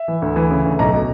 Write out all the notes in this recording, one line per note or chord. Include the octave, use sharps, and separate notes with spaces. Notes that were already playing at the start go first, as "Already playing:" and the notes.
Already playing: E5
E3
D2
E3
C#3
D2
B1 A#5
B2